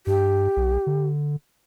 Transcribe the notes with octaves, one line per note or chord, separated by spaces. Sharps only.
G2 G4
B1
D3